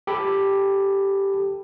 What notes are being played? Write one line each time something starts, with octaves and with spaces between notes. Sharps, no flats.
G4 A4 B5